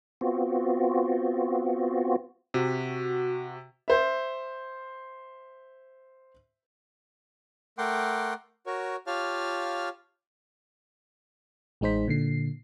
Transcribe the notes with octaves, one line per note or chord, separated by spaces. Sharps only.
B3 C4 F4 F#4
C3 F#4
C5 E5
A3 A#4 F#5 G5 C6 D6
F#4 A#4 C#5
F4 G4 C#5 F5 A5 F6
A1 G#3 D#4 C5 B6
A#2 D3 C7